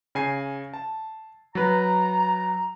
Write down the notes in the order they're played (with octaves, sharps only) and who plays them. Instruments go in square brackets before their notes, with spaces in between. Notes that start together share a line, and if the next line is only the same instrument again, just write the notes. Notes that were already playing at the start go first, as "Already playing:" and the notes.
[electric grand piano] C#3 G#5 C7
A5
[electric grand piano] F#3 B4 [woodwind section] A#5